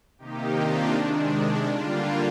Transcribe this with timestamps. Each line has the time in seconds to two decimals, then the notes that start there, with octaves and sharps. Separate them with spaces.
0.18 C3 D#3 A#3 D#4 G4
0.56 D4 F4
0.94 C3 D#3 G#3 D4
1.31 D4
1.68 D3 G3 A#3 D4 F4